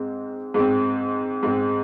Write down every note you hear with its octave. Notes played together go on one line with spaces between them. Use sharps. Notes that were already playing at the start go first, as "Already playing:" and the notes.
Already playing: G#2 G#3 C4
G#2 G#3 C4
G#2 G#3 C4